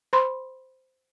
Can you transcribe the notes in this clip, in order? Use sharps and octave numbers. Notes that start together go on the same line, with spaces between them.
C5 B5 C6